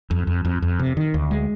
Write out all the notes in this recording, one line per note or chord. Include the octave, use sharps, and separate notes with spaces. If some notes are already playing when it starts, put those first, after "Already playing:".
F2
F2
F2
F2
C3
D#3
D2
G#3